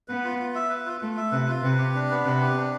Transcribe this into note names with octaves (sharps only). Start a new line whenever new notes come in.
B3 B4
F4
F4
E5
B4
F4
A3 F4
E5
C3 B4
F4
C3 B4
G4
D4
B3
C3 B4
G4
D4